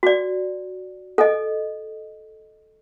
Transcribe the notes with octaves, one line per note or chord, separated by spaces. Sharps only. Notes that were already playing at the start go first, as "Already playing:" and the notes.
F#4 D5
A4 D#5